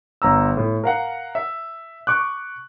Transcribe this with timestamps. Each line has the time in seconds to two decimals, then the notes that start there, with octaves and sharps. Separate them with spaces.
0.22 G1 A#5 E6
0.57 A2
0.84 A#4 F5 F#5
1.35 E5
2.07 C#6 D6 F#6